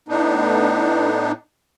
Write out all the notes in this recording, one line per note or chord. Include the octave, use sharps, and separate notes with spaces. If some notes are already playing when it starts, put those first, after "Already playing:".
A2 B3 D4 D#4